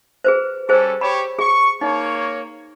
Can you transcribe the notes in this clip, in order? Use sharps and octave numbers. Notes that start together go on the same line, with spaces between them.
G#4 B4 C5
G3 C#4 G#4 A4 C5
G4 C#5 B5
G#4 C#6
A#3 D#4 C#5